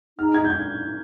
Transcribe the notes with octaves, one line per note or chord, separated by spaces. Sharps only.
D#4 G#4 D#5 A#5 F6
G#6
G6
G#6